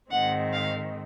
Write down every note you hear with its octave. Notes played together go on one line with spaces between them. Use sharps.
G#2 D#3 G#3 C4 F#5
F5